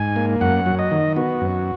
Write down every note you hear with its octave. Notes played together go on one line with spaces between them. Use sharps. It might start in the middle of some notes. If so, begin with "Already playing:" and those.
Already playing: G#2 G#5
A#3
F#2 F#5
F#3
D#5
D#3
B3 F#4
F#2